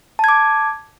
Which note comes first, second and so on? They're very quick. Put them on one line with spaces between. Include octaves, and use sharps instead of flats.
A5 G#6 D6